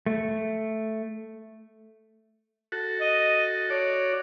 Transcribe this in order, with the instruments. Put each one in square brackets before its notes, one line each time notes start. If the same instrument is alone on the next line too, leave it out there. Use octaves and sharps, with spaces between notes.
[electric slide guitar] A3
[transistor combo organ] F#4 A4
[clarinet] D#5
[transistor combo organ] F#4 D5 [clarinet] C#5